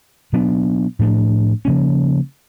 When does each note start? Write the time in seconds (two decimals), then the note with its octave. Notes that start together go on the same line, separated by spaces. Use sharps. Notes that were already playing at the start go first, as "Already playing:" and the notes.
0.33 B2 F#3 B3 D4
0.99 A2 F3 A3 D4
1.65 C#3 F3 A#3 C#4